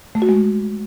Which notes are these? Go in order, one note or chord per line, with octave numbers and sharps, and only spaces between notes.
A3
F#4
G#3